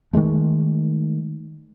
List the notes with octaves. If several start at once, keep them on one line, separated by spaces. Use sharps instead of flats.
D#3 F3 G#3 A3